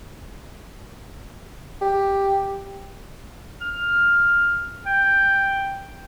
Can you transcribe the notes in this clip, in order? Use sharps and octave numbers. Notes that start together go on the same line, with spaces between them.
G4
F6
G5